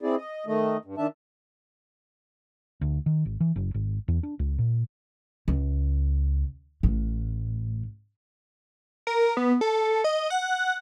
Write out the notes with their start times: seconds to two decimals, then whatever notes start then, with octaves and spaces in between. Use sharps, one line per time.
0.02 C4 E4 G#4 D5
0.17 D#5
0.47 D#3 A3 D#5
0.85 G2
0.97 D#3 D4 E5 A5
2.81 D2
3.06 D#3
3.25 G#1
3.40 E3
3.56 F#1
3.74 G#1
4.08 E2
4.23 D4
4.39 C#2
4.58 A#2
5.48 C#2
6.83 A1 A2
9.07 A#4
9.37 B3
9.61 A4
10.04 D#5
10.30 F#5